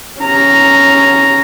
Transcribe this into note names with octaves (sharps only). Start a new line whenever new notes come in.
C#4 A#5